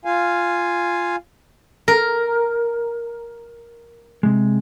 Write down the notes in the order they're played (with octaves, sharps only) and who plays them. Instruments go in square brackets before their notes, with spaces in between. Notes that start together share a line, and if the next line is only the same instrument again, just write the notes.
[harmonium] F4 F5 G#5
[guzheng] A#4
[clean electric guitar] C3 G#3